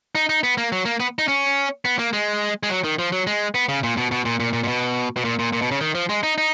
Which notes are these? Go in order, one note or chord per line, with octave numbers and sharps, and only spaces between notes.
D#4
D#4
B3
A#3
F#3
A#3
B3
D#4
C#4
B3
A#3
G#3
G#3
F#3
D#3
F3
F#3
G#3
B3
C#3
A#2
B2
B2
A#2
A#2
A#2
A#2
B2
B2
A#2
A#2
A#2
B2
C#3
D#3
F3
G#3
D#4
D#4